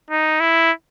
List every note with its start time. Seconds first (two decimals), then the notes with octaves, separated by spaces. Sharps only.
0.11 D#4
0.40 E4